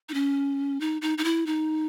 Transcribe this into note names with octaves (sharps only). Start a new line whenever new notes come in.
D#4
C#4
D#4
D#4
D#4
E4
D#4